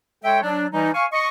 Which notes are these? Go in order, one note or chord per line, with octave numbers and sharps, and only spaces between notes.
G#3 A4 C#5 E5 G5
F#3 D4
E3 G3 D#4
F5 G#5 C#6
D#5 C#6